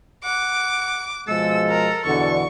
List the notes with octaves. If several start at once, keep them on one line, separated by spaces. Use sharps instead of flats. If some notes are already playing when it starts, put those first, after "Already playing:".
F#5 D6
B2 F3 G#3 A4 E6
A#4
E2 B2 D3 C#6